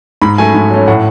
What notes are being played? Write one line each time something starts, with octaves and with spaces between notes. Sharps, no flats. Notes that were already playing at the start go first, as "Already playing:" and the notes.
G#2 B5
F#3 A3 C#4 G#5
G#2
F#3 A3 C#4
A2 F#5